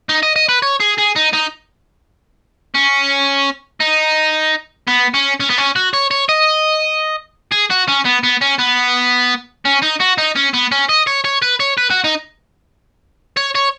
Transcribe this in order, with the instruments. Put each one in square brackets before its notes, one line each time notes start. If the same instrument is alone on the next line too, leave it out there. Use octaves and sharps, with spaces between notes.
[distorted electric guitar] D#4
D#5
D#5
B4
C#5
G#4
G#4
D#4
D#4
C#4
D#4
B3
C#4
C#4
B3
C#4
F#4
C#5
C#5
D#5
G#4
F#4
C#4
B3
B3
C#4
B3
C#4
D#4
F#4
D#4
C#4
B3
C#4
D#5
C#5
C#5
B4
C#5
B4
F#4
D#4
C#5
C#5